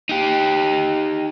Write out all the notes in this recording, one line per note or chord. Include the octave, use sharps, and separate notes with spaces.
D#4 G4